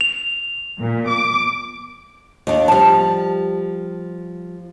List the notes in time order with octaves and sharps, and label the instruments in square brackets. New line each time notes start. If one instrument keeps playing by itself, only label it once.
[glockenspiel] F7
[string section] A#2
D6
[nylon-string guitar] D#2 D4
[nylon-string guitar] F3 G3 [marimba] A5